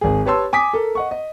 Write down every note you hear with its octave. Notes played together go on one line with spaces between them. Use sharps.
G#1 G#4
G4 B4 C#5 A5 C6 E6
G#5 D6 D#6 B6
A4 A#4
D#5 F#5 C#6
D#5